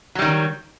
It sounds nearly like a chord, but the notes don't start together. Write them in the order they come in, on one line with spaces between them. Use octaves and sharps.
F#3 G3 D#3